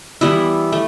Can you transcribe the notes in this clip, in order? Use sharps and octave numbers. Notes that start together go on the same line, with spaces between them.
E3 G3 B3 E4
A3